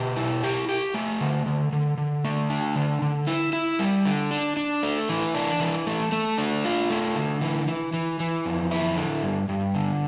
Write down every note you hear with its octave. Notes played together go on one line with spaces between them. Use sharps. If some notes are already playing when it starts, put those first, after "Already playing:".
Already playing: B2 G4
E4
G4
G4
A3
D3
D3
D3
D3
A3
D4
D3
D3
E4
E4
G3
D3
D4
D4
A3
E3
D4
E3
A3
A3
D4
F4
A3
D3
E3
E3
E3
E3
F2
E4
D3
G2
G2
D3